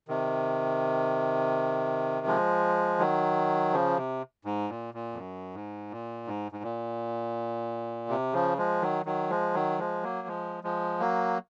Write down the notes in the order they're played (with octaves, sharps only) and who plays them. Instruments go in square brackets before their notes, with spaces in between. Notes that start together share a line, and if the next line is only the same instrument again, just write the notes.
[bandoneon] C3 D#3
F3 G#3
D#3 F#3
C#3 F3
C3
G#2
A#2
A#2
F2
F#2
G#2
A#2
G#2
G#2
A#2
C3
C#3 F3
F3 G#3
D#3 F#3
D#3 F#3
F3 G#3
D#3 F#3
F3 G#3
F#3 A#3
F3 G#3
F3 G#3
F#3 A#3